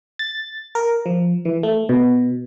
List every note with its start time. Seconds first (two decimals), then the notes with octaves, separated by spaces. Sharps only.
0.19 A6
0.75 A#4
1.06 F3
1.45 E3
1.63 A3
1.89 B2